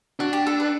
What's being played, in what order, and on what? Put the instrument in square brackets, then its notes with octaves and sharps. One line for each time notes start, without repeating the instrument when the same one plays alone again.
[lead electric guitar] D4 [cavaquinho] F#4
[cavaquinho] G4
A4
B4